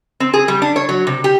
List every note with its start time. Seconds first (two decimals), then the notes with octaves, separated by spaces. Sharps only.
0.20 C4
0.34 G#4
0.48 G3
0.62 D4
0.76 C#5
0.89 F#3
1.07 C3
1.24 G4